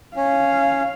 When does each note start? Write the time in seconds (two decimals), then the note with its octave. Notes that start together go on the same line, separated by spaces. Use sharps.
0.16 C#4 F5